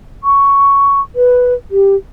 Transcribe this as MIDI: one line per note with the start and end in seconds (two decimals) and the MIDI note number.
0.24 1.00 85
1.15 1.54 71
1.71 1.95 67